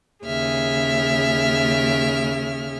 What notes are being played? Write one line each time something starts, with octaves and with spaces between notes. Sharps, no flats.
D#2 C#3 G#4 E5 F6